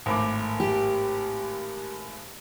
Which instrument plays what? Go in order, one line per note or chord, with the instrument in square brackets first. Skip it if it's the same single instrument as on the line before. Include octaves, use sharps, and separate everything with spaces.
[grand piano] G#1 A2 D6
[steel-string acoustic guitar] G4